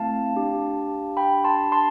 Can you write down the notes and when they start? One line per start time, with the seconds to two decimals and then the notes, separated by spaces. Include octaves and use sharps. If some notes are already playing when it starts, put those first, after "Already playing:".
Already playing: A3 C4 E4 F5 A5
0.35 D4 G4
1.17 G5 B5
1.44 A5 C6
1.72 A5 C6